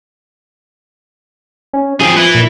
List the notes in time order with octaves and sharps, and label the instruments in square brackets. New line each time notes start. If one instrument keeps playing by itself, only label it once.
[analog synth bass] C#4
[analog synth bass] F3 [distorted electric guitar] C4 G#4
[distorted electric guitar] E4 B4
[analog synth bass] A#2